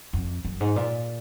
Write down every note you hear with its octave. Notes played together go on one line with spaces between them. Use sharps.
F2
F#2
G#2
A#2